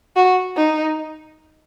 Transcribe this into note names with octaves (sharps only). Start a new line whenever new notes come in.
F#4
D#4